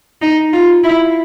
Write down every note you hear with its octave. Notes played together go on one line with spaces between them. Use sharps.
D#4
F4
E4